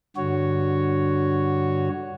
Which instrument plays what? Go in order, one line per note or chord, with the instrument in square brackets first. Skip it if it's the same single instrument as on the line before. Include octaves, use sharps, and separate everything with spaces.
[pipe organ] G2 D3 F#4 C#5